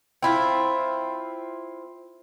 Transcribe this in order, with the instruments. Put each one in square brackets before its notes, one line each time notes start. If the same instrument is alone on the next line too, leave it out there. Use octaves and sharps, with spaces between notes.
[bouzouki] C4 E4 F4